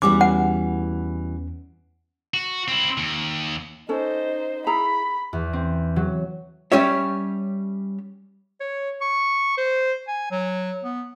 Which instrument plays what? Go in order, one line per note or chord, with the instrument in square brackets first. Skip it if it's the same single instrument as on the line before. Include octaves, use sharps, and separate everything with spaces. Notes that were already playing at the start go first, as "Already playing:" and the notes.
[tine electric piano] E2 C#4 [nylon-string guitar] E3 G3 F#4 [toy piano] D6
[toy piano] F#5
[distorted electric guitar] F#4
C4 E4
D#2
[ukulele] C#4 A4 [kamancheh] D#4 C5
[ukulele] E4 G#4 A#5 [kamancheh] B5
[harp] E2
C4
F#3
[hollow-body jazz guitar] G3 C#4 G4 C#5 E5
[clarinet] C#5
C#6
C5
G#5
F#3
B3